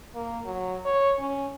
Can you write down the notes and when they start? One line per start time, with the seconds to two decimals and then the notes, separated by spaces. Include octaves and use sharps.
0.15 A#3
0.45 F#3
0.85 C#5
1.19 C#4